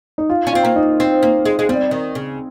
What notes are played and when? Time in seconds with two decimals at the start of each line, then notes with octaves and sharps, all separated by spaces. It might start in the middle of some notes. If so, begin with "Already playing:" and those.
0.18 D#4
0.30 F4
0.47 C#4
0.53 C4 F4
0.65 A#3
0.76 D#4
1.00 C4
1.23 A#3
1.45 G#3
1.59 G#3
1.69 G3 C4
1.91 D#3
2.15 C#3